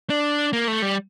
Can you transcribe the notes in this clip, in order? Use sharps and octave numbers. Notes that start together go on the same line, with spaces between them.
D4
A#3
A3
G3